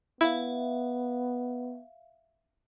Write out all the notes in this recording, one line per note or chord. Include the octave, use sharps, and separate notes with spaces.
B3 E4 E5 F5